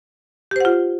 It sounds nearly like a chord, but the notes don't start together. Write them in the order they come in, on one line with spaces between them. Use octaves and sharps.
G4 C5 F#5 F4